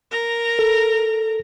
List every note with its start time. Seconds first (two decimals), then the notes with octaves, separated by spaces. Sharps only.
0.11 A#4 A#5
0.59 A4